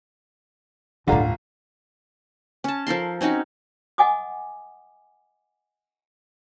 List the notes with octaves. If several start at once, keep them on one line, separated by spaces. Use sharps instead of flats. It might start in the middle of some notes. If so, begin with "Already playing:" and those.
G1 D#2 A2 D3 F4 A#5
C#4 A5
F3 A4 A#4 C6
C4 C#4 D#4 F#4
D#5 F#5 G#5 D6 D#6